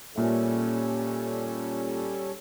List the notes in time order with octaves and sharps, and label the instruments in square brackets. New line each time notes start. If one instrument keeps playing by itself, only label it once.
[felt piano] A#2 E5 [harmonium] G3 C#4 A4